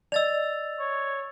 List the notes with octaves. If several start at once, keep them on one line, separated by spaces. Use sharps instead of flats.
D5 D#5 E6 A6 F7
C#5